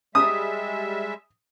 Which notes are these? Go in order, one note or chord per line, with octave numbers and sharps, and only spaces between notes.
G3 G#3 E5 D#6